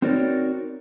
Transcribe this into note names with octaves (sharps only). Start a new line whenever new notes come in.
C4 D#4 F#4 A#4 C#5 D5